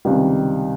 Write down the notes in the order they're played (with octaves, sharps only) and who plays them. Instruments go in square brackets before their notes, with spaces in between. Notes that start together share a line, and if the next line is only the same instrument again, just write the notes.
[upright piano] C#2 C3 D#3 G3